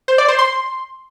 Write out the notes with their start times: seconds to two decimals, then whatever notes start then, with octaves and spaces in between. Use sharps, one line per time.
0.08 C5
0.18 D5
0.28 C5
0.39 C6